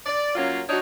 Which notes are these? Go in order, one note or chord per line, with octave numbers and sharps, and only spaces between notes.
D5
F#3 A#3 C#4 F4
D4 D#4 F#4 C#5